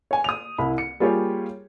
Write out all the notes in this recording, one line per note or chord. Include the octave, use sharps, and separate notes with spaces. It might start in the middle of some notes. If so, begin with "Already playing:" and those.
C#5 G#5
D#6 F7
C2 E4 B5
C#7
G3 A#3 F4 G4 G#4 C#5